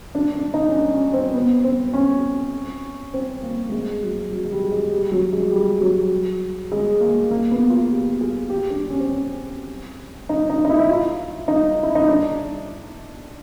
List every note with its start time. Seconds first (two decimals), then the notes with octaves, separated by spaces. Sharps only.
0.15 D4
0.35 D4
0.54 D#4
0.69 C#4
0.75 D4
0.94 C#4
1.14 C4
1.34 B3
1.64 C4
1.93 C#4
3.14 C4
3.43 A#3
3.69 A3
3.72 G#3
4.03 F#3
4.32 F#3
4.45 G#3
4.52 G3
4.72 G#3
4.93 G3
5.12 F#3
5.32 G#3
5.52 G3
5.81 F#3
6.72 G#3
7.00 A#3
7.31 A#3
7.51 B3
7.70 F4
7.91 G4
8.10 G4
8.21 G#4
8.50 G4
8.70 D4
8.90 C#4
9.00 C4
9.11 C#4
10.29 D#4
10.50 D#4
10.65 D#4
10.69 E4
10.80 E4
10.89 F4
11.48 D#4
11.83 E4
11.95 D#4
12.09 D4